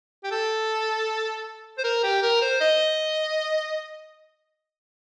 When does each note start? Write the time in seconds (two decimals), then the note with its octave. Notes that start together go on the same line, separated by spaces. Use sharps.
0.24 G4
0.31 A4
1.78 C5
1.84 A#4
2.03 G4
2.22 A#4
2.42 C5
2.61 D#5